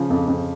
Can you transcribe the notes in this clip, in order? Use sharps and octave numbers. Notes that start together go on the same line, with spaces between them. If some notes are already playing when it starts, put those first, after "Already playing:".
Already playing: C#3 F3
F2
F2